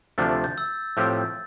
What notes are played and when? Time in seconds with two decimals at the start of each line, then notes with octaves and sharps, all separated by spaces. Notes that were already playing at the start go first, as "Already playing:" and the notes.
0.18 D2 C3 F3 A3 D4 A6
0.31 A6
0.44 G6
0.58 E6
0.97 A2 F3 C4 G4